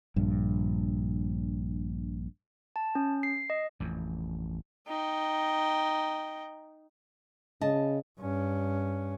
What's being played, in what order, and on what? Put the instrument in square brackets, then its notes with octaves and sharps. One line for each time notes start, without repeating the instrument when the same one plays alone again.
[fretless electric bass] A#1 G2
[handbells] A5
C#4
C7
D#5
[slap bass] A1 F2
[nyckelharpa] D#4 G5
[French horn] C#3 [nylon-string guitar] D#5 A5
[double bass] G2 C#4